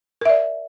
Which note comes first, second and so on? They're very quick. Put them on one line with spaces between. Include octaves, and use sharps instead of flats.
A#4 E5 D5